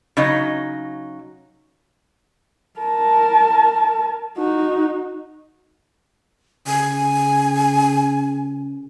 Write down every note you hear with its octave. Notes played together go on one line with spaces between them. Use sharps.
C#3 F#3 D#4
A#4 A5
D#4 F#4
C#3 G#5